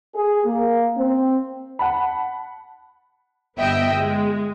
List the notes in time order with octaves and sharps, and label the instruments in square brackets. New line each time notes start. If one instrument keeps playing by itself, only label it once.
[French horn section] G#4
A#3
C4
[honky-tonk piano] F#5 A5 B5
[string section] G1 B3 D#5 E5 G5
G#3